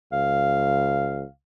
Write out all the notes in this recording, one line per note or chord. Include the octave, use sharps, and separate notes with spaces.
C#2 F5